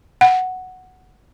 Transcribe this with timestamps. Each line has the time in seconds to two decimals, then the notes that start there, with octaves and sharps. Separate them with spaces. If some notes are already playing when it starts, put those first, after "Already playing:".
0.21 F#5